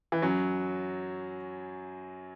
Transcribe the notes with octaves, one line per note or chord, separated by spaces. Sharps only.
E3
F#2 F#3